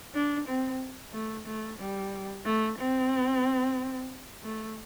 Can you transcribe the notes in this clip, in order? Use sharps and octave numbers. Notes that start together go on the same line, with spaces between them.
D4
C4
A3
A3
G3
A3
C4
A3